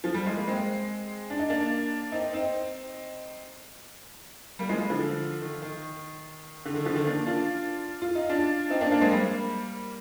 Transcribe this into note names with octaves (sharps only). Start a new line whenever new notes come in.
F3
G3
G#3
A#3
G#3 C4
D4
D#4
A#3 D4
C4 D#4
C4 D#4
G3 A#3
F3 G#3
D3 F3
D#3
D#3
D3
D#3
D3 F3
D#3
A#3 D4
D4 F4
F4
D#4
D4 F4
C4 D#4
A#3 D4
A#3 D4
G#3 C4
G3 A#3